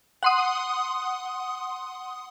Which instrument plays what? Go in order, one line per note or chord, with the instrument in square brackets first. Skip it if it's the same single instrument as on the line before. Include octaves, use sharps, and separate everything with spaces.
[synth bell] F#5 C6 D#6